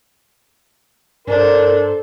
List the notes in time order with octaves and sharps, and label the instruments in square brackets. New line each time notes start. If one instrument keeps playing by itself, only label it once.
[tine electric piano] G2 [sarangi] D4 [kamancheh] A4 C5 [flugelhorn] A#4